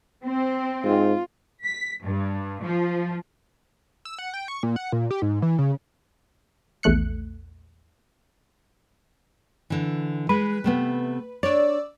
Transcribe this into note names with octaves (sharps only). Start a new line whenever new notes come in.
C4
G#2 F4
B6
G2
F3
E6
F#5
G5
C#6
A#2
F#5
A#2
G4
G#2
E3
C#3
A#1 E2 A3 F#6 C#7
D3 E3
G#3 B4
C3 A3 B3
D4 C#5 D5 E6